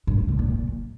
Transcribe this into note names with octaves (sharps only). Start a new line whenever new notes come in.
G2
A2
C3
A#2
A#2